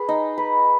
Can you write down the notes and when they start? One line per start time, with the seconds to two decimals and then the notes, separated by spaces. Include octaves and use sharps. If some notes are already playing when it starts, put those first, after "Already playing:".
Already playing: G#4 B4
0.09 D#4
0.38 B4